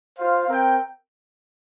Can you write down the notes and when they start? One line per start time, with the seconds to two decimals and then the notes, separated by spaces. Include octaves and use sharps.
0.19 F4 C5 F5
0.49 C4 A#4 G5